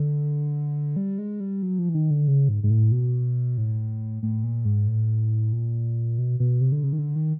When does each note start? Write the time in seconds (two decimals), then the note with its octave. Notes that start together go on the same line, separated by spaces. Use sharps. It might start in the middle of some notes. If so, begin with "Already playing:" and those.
Already playing: D3
0.96 G3
1.18 G#3
1.40 G3
1.63 F#3
1.79 F3
1.89 E3
1.95 D#3
2.10 D3
2.28 C#3
2.49 G#2
2.63 G#2
2.70 A2
2.92 B2
3.58 A2
4.23 A2
4.44 A#2
4.65 G#2
4.88 A2
5.53 A#2
6.18 B2
6.40 B2
6.61 C3
6.72 D3
6.83 C#3
6.93 D#3
6.98 D3
7.16 D#3